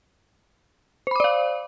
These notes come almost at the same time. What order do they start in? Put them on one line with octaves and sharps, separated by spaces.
C5 B5 D6 D5 F5